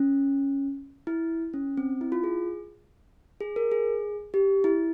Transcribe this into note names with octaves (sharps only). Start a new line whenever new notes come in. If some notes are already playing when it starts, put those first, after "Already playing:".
Already playing: C#4
E4
C#4
C4
E4
F4
G#4
G#4
A#4
G#4
G4
E4